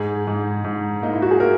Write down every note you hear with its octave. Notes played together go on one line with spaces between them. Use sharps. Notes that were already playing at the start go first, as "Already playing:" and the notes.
Already playing: G#2 G#4
G#2
G#2
A#3 D#4
E4
F#4
G#4
A#3 A#4